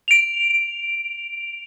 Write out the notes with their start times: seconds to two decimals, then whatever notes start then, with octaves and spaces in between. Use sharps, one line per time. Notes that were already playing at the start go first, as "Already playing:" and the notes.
0.08 D7 F7